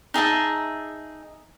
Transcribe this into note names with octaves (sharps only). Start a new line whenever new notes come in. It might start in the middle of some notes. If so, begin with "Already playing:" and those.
D#4 G#4 E5 A5